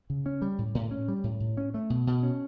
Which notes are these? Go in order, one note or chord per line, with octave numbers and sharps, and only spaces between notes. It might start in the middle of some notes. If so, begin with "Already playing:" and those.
C#3
C#4
G3
A2
A2
C#4
G3
A2
A2
C#4
A3
B2
B2
C#4